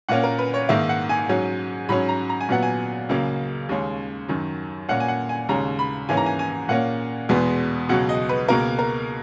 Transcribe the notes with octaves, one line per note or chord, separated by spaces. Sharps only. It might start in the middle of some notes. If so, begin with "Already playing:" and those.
A#2 A#3 C#4 F#5
A#4
B4
C#5
G#2 D#3 A#3 E5
F#5
G#5
G#2 F#3 C#4
G#2 F#3 C#4 B5
A#5
A#5
G#5
A#2 F#3 B3 F#5
G#5
C#2 C#3 F#3 A#3
D#2 C#3 G#3 C#4
F#2 D#3 F#3
A#2 A#3 C#4 F#5
G#5
F#5
G#5
D#2 C#3 G#3 C#4 A#5
B5
G#2 E3 A#3 C#4 G#5
A#5
G#5
G#5
A#2 A#3 C#4 F#5
E2 B2 G#3 B3
C#2 B2 F#3 F#5
D#5
B4
C#2 B2 A#3 A#4
A#4